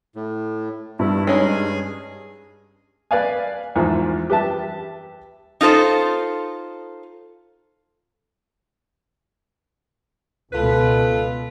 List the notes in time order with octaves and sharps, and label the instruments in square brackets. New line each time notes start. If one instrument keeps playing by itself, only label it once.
[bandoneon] A2
[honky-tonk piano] G2 [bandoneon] E4
[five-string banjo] G#3 C#4 D#4 [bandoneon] G#4 G#5
[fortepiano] B4 D5 F5 G#5
E2 G#2 F3
G4 B4 E5 A5
[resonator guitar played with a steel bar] D#4 F4 A4 C5
[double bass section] C#2 B2 [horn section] F4 A4 B4